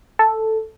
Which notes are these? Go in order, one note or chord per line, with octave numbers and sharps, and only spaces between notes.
A4